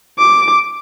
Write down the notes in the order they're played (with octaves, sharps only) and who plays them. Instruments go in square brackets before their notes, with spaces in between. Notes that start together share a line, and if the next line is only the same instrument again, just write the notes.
[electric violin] D6